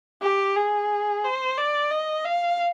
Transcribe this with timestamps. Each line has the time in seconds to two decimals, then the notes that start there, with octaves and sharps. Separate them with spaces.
0.22 G4
0.56 G#4
1.24 C5
1.58 D5
1.91 D#5
2.25 F5